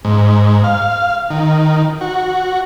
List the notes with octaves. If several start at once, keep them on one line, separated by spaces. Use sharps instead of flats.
G#2
F5
D#3
F#4